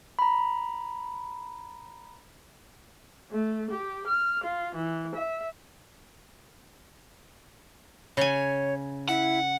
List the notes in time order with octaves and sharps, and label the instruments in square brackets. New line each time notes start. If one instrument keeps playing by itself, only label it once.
[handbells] A#5 B5
[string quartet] A3
G4
F6
F4
E3
E5
[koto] C#3 G#5 [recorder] C#5
[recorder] E4 [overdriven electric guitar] F#5